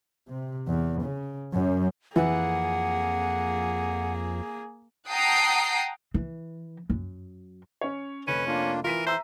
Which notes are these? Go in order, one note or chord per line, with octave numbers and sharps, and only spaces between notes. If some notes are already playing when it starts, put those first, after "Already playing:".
C3
E2
C#3
F#2
F2 E3 A#3 G#4 F#5
F#5 G5 A5 A#5 D#6 C7
E3
F#2
C#4 C#5
F1 C#4 B4
A#3 D4 F4
E3 F4 A#4 B6 D#7
C5 E5 A#5 E6